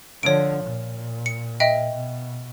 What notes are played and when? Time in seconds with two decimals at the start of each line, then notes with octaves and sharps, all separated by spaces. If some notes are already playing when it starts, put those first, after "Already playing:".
0.23 D3 F3 C#5 D7
0.64 A#2
1.26 C#7
1.60 D#5 E5 G5
1.94 B2